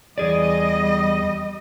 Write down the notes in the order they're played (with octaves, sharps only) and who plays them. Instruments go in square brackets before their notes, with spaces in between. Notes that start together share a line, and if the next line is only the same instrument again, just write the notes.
[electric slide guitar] E2 G#4 D5 [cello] G3 D#5